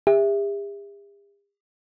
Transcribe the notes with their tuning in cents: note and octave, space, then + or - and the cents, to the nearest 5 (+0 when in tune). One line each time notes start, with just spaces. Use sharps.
G4 +45 E5 +0